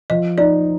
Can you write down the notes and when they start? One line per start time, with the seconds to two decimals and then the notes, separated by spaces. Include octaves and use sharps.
0.10 F3 D#5
0.38 D#4 D5